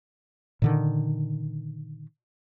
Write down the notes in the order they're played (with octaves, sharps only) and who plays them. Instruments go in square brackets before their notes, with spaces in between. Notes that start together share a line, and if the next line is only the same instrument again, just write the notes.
[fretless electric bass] A#2 D3 D#3